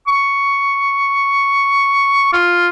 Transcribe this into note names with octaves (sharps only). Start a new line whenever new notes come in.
C#6
F4